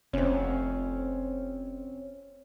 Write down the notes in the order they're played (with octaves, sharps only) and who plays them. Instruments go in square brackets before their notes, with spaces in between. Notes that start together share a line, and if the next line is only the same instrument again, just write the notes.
[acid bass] F1 [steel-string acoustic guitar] C4 C#4